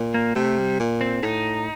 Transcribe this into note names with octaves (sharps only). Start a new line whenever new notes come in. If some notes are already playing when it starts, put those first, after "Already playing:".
Already playing: A#2
A#3
C3 A3
G3
A#2
C4
A2 D#4